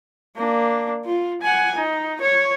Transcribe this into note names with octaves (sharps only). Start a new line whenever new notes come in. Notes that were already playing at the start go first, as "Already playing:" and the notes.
A#3 D4
F4
F#5 G#5
D#4
C#5